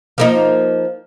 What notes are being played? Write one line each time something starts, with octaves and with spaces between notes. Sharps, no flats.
F3 A#3 D#4